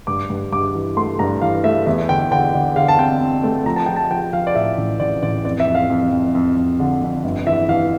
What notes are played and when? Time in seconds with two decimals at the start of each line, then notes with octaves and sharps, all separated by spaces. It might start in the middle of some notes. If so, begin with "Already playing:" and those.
0.07 G2 D6
0.30 G2
0.52 G2 D6
0.75 E3
0.97 A3 C6
1.19 G2 A#5
1.41 E3 F5
1.64 A3 E5
1.86 E2 E5
2.09 D3 G5
2.31 D3 G5
2.54 D3
2.76 D3 F5
2.88 A5
2.99 C4 G5
3.21 C4
3.44 A3
3.66 F3 A#5
3.76 A5
3.86 F3 G5
3.96 A5
4.10 F3 G5
4.33 F3 F5
4.47 D5
4.55 A2 E5
4.78 A1
5.00 A1 D5
5.23 A1 D5
5.45 F2 D5
5.60 E5
5.67 F2
5.75 F5
5.90 F2
6.12 F2
6.35 F2
6.57 F2
6.79 D3
7.02 F2
7.24 G1
7.47 E3 E5
7.69 E3 F5